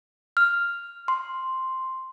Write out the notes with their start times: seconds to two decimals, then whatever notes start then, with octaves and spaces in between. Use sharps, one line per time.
0.37 F6
1.08 C6